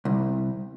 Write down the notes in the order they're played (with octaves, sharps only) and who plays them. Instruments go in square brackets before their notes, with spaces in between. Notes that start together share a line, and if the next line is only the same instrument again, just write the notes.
[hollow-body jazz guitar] C2